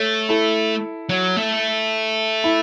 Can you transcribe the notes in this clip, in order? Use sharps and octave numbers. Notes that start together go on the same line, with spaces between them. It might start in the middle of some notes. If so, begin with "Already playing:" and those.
Already playing: A3 A4 C#5
E4 A4
F#3
A3
E4